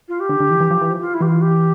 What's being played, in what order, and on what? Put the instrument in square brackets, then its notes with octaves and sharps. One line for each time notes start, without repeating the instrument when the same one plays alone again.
[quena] F4
G4
[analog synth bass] D3
D3
E3
E3
F3
E3
F3
[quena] F4
E4
[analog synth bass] E3 [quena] G4
[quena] F4
G4